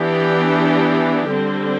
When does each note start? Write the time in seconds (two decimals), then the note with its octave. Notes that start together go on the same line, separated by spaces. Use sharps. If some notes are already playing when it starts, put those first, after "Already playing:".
Already playing: E3 B3 D4 G4
1.29 D3 G3 C4